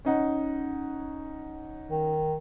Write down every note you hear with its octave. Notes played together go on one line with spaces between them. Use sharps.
C#4 D#4 F#5
D#3